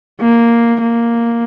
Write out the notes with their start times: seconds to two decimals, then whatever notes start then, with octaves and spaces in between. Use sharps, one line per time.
0.21 A#3
0.80 A#3